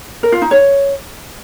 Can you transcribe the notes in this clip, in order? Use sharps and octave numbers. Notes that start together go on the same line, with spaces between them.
A#4
F4
D#4
C#5